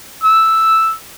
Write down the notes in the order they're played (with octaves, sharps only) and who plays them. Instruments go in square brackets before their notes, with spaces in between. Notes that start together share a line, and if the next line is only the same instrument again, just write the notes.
[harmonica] E6